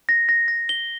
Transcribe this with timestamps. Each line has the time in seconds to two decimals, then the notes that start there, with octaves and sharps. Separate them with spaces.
0.09 A#6
0.29 A#6
0.48 A#6
0.69 G7